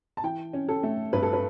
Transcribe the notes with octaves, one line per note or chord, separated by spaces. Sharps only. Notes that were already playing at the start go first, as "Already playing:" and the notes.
A5
E3 G5
C#4
A4
A3
G2 B4
A4
B4